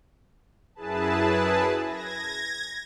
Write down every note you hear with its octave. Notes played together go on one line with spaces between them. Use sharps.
F#2 E4 G#4 B4 A5
G#6 A#6